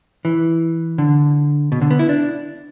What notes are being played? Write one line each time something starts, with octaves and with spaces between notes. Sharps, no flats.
E3
D3
B2
D3
B3
E4
D4